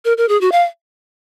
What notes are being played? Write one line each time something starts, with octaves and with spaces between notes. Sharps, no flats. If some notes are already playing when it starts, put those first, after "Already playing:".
A#4
A#4
G#4
F#4
F5